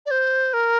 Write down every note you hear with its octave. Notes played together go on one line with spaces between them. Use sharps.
D5
C5
A#4